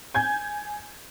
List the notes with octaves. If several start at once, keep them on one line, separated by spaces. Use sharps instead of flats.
G#5 G6 G#6